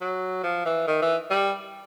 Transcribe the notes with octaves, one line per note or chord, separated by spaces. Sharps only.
F#3
F3
E3
D#3
E3
G3